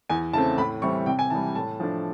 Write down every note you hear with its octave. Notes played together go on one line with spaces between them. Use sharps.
E2 G#5
C#3 E3 A3 C4 A5
A2 B5
E3 G3 C4 E4 C#6
C3 G5
G#5
E3 G3 A5
A2 A5
F3 A3 D4